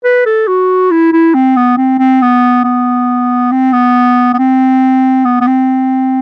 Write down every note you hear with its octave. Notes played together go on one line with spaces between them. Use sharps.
B4
A4
F#4
E4
E4
C4
B3
C4
C4
B3
B3
C4
B3
B3
C4
B3
B3
C4